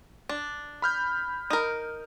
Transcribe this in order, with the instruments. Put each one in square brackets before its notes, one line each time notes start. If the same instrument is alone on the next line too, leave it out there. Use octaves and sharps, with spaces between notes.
[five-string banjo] D4
[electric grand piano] B5 F6 G6
[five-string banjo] D#4 A#4